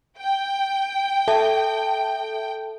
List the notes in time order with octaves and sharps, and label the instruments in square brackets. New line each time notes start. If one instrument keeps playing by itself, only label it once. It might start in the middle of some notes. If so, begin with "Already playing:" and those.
[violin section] G5
[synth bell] A4 E5 A5